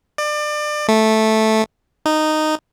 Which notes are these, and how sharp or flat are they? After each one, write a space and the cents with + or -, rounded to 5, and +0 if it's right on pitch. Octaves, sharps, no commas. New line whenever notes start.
D5 +30
A3 -5
D#4 -10